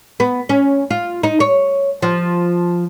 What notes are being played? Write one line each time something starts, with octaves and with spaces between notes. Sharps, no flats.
B3
C#4
F4
D#4
C#5
F3